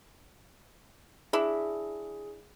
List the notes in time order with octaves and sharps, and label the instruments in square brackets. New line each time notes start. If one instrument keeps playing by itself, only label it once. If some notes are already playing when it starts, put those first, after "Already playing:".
[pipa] D4 E4 [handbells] G#4